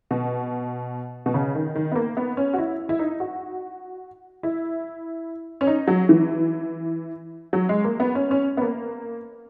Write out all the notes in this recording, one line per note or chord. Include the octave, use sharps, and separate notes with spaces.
B2
B2
C#3
D#3
D#3
B3
A#3
B3
C#4
F#4
E4
E4
D#4
F#4
E4
C#4
D#4
F#3
E3
F#3
G#3
A#3
B3
C#4
C#4
B3
A#3